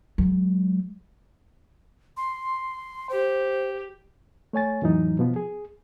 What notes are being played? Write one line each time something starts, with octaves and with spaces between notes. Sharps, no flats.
F#3 G#3
C6
G4 C5
A3 C#5 G#5 A6
F2 A2 E3 F#3 D#4
B2 F3 B3
G#4